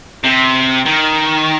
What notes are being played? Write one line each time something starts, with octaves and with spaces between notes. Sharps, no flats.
C3
D#3